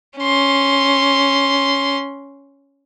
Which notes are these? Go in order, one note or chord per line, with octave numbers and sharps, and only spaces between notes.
C#4 C6